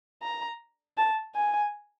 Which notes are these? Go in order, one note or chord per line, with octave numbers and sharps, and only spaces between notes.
A#5
A5
G#5